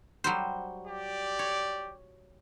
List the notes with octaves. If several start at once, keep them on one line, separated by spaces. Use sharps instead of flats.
F#3 G3 C5
G4 D5
C#5